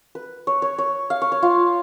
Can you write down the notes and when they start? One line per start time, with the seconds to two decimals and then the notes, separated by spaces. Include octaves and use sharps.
0.15 B4
0.47 C#5
0.62 C#5
0.78 C#5
1.10 F5
1.22 C#5
1.32 C#5
1.42 F4